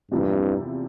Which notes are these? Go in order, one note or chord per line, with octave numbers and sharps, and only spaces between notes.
E2 G2 C3 F3 A#3 E4